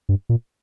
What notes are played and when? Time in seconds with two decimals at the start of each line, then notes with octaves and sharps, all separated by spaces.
0.09 G2
0.29 A#2